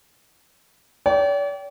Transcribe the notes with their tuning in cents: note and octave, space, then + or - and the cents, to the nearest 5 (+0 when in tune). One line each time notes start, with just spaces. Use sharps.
D5 -45 G5 -15